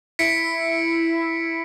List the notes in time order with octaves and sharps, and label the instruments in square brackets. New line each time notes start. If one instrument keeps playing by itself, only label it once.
[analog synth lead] E4 [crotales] B6 C#7 D7